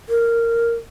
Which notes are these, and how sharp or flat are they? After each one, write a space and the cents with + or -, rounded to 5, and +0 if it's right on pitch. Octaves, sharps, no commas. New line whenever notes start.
A#4 -10